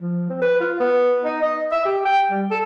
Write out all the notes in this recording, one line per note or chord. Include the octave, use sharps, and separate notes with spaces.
F3
C4
B4
F4
B3
D#4
D#5
E5
G4
G5
G3
A4